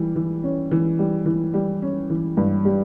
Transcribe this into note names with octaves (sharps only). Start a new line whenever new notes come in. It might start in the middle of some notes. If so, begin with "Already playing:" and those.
Already playing: E3 G3
E3
C#4
E3
G3
E3
G3
C#4
E3
G2
G3